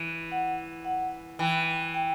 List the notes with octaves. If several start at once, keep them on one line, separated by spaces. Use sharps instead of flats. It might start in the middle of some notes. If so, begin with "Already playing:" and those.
Already playing: E3
F#5
F#5
E3 G5
G5